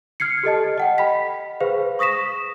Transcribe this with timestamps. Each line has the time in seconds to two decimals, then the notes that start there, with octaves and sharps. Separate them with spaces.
0.20 F6 G#6 C7 C#7
0.43 G4 A4 D#5 A5
0.78 D#5 F#5 G5
0.98 B5 B6
1.60 G#4 B4 C5 F5
1.99 C#6 D#6 A#6 B6 E7